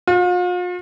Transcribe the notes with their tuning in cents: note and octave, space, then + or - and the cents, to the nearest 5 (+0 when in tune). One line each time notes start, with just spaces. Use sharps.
F4 +40